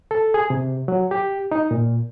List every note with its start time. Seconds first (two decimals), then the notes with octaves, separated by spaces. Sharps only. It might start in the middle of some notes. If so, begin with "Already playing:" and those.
0.11 A4
0.34 G#4
0.50 C3
0.88 F#3
1.11 G4
1.52 D#4
1.71 A#2